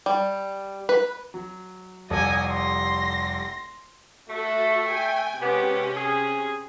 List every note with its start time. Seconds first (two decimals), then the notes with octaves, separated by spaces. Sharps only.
0.06 G3
0.89 B4
1.34 F#3
2.10 F1 C2 A4 D#5 G#5
2.48 C6 A#6
4.29 A3 F#4 A4
4.87 G5 G#5
5.40 C3 G#3 B3 C#4 G4
5.94 G#4